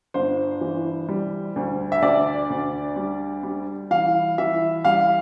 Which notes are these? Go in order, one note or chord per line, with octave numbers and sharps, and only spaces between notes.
G1 C5
E3
G3
D2
E5
D2 D5
D2
G3
G3
E3 F5
E3 E5
G3 F5